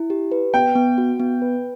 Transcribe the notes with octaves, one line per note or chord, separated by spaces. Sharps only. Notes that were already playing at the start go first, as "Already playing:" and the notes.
Already playing: E4
G4
B4
B3 G5
B3
F#4
B3
B4